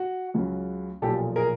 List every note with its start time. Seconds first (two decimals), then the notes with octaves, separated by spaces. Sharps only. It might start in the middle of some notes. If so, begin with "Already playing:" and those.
Already playing: F#4
0.34 C#2 C#3 F#3
1.02 B1 A#2 F3 G4 A4
1.36 G#4 A#4